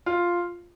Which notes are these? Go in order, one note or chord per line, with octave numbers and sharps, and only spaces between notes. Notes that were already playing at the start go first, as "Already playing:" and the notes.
F4